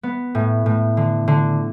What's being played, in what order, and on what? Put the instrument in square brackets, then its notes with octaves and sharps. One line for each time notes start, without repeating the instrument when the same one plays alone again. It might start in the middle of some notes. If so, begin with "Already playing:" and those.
[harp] B3
A2
A2
D3
D3